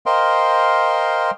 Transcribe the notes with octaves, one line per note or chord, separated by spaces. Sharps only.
A#4 C5 D#5 F5 G5 C6